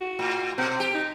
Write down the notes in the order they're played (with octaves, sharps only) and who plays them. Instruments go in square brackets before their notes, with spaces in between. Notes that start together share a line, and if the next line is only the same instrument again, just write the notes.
[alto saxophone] F#4
[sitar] A2
[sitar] B2 [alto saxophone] C4
[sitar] G4
[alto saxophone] D#4